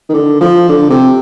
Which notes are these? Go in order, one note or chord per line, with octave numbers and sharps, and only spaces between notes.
D#3
D3
F3
D3
C3